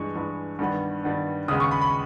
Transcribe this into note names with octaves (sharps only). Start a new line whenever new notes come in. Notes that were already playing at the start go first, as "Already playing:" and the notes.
Already playing: G2 E3 G#3 C#6
G2 E3 G#3
G2 D#3 G3 B3
G2 D#3 G3 B3
D#2 C#3 G#3 B3 D#6
C#6
B5
B5